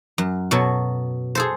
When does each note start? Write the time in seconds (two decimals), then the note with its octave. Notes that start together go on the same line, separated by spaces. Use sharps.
0.18 F#2
0.51 B2 F#3 A4
1.35 G#4 A4 C5